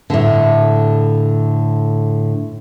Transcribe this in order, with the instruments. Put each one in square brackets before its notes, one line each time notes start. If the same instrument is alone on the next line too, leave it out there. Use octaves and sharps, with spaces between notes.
[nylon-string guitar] A2 D3